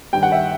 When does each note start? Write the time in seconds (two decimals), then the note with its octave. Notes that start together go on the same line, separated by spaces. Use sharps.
0.13 G2 D#3 G5
0.23 F#5
0.32 E5